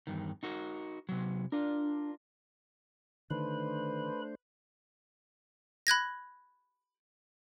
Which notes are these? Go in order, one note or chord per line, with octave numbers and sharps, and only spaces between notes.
E2 G2 D#3
D#4 F#4 A#4
C3 F#3
D4 F4 A#4
D3 D#3 A3 D4 B4 C5 B5
B5 F#6 G#6 A#6